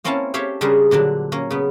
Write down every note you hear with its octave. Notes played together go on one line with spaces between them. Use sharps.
A#3 C4 C#4 E4 F5 A5
G4 A4 C#5 E5 F5 G5
C#3 G3 D4 G#4 A#4 C5
A#2 D3 F#3 D4
A#3 C#4
C#3 B3